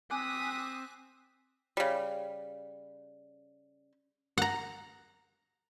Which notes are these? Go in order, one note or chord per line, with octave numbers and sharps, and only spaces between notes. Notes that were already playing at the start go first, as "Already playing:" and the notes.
C4 G#5 D6 D#6 F#6 B6
C#3 G3
F#5 A#5